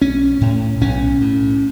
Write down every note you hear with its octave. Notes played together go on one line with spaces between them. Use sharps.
B1 C#4
A2
B1 C#4
A2